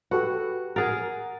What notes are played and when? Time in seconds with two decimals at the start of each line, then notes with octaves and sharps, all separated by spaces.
0.11 F#4 G4 A4 B4
0.76 G#4 A#4 F#5 A6